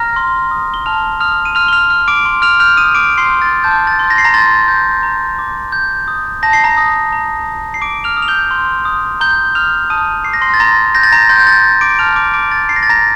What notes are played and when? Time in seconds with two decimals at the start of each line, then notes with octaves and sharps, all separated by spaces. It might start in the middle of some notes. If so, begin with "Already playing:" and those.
Already playing: A#5 F6 A#6
0.16 C6
0.51 D#6
0.74 G7
0.86 A5 F6 F7
1.20 D#6 F6 F7
1.45 D#7
1.55 C6 F6 F7
1.68 G7
1.73 F6 F7
1.90 F6
2.08 D6 D7
2.26 C6
2.42 F6 F7
2.60 F6 G6 F7
2.77 D#6 D#7
2.95 C6 D6 D7
3.18 C6 C7
3.30 G6
3.42 A6
3.64 A5 G6
3.87 A6
3.99 C6
4.10 A#6
4.18 C7
4.24 A#5 A#6
4.34 C6 A6
4.68 G6
5.03 A#5
5.39 D6
5.72 C6 G6
6.08 D#6
6.43 A5 A#6
6.53 C7
6.64 A#5 A#6
6.77 D#6
7.13 A#5
7.46 D#6
7.74 C7
7.82 A5 D6 D7
8.04 F6 F7
8.17 D#6
8.22 F7
8.28 G6 G7
8.51 C6
8.85 D#6
9.21 A#5 G6 G7
9.55 D#6 F6 F7
9.90 A5 D#6 D#7
10.24 D6 C7
10.33 A#6
10.42 C6 C7
10.54 A6
10.59 A#5 C6 A#6
10.95 G6 A#6
11.03 A6
11.12 A#5 A#6
11.29 C6 G6
11.40 G6
11.47 A6
11.64 G6
11.81 D6 D7
11.99 A5 F6 F7
12.16 D6 D7
12.34 D6 D7
12.52 A6
12.69 A#5 C7
12.76 A#6
12.83 A6
12.90 A#5 A#6